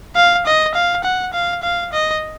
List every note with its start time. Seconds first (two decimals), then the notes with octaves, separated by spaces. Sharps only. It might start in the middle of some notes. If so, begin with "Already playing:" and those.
0.16 F5
0.46 D#5
0.75 F5
1.04 F#5
1.33 F5
1.63 F5
1.93 D#5